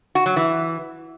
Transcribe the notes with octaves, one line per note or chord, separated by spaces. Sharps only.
F#4
F#3
E3